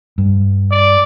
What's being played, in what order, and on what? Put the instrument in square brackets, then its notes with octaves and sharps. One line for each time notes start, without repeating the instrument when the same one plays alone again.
[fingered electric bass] G2
[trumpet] D5